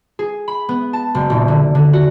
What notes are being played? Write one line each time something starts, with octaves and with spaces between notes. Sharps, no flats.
G#4
B5
B3
A5
F#1
D#1
D3
D3
F#4